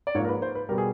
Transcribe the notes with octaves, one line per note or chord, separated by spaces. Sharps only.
D5
G#2 F3 A#3 C#5
A#4
B4
C5
B4
B2 G3 A#4
G#4